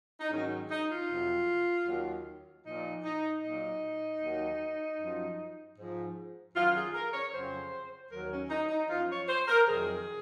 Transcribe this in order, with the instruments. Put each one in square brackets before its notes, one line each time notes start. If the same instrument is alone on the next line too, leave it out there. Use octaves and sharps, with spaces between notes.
[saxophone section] D#4
G#2 D#3 F#3 C#4
D#4
F4
F2 C3 F#3
D#2 D#3 F#3
A#2 F3 D#4
D#4
A#2 F#3 D#4
D#2 D#3 F#3
F#2 F3
G#2 F3
F#2 D#3 F#3 F4
G#4
A#4
C#5
F2 C#3 F#3 C5
D#2 D#3 F#3 A#4
C#4
D#4
D#4
F#2 F3 F4
C#5
C5
A#4
F2 C3 D#3 F#3 G#4